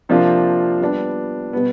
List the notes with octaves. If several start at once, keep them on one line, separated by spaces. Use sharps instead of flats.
C3 F3 A#3 D4 F4
G3 B3 D4
B2 G3 B3